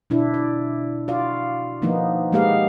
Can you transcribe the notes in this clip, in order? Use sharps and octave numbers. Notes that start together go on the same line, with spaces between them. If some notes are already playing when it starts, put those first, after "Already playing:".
B2 D4 E4
D5
F4 F#4 D5 F5
D#3 F3 A#3 B3 D#4
G#3 A#3 B3 G4 A#4 F5